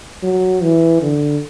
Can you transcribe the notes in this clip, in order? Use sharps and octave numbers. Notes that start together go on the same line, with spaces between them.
F#3
E3
D3